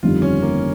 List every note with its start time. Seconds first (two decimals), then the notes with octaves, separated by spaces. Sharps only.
0.03 G1 F2 D#3 G3 F4
0.22 C#4
0.42 A#3